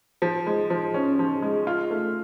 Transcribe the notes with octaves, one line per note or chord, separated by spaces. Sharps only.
F3
G#3
F3
C#4
F3
G#3
F4
A3